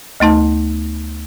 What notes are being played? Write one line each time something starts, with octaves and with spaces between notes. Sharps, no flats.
D2 A3 D#4 A5